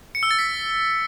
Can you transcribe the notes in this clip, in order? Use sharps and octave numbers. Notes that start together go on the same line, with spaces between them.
C#7
E6
A6
B6